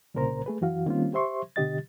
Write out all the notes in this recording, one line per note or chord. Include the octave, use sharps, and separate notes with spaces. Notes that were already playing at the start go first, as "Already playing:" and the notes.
C2 A#2 C#3 A#4 C5 A#5
A3 G#4 B4
F#2 E3 F#4 F5
D#3 G3 A#3 C4 C#4 F4
G4 C5 E5 C6 C#6
B2 D3 G4 D#5 A6